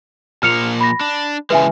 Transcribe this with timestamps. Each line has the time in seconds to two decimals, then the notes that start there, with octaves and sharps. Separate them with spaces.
0.43 A#2 F3 A#3 F6 C#7 F7
0.81 B5 A#6
1.01 D4
1.50 C#3 E3 G#3 B4 E5 G#5